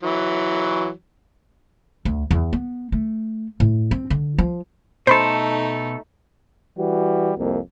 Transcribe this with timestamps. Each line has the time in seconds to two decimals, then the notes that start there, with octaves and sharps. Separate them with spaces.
0.03 E3 F#3
2.05 D2
2.31 E2
2.53 B3
2.92 A3
3.60 A2
3.91 C4
4.10 D3
4.38 F3
5.07 B2 A3 D#4 A4 C5 B5 C6
6.78 E3 G3 F#4
7.37 C2 F2 A#3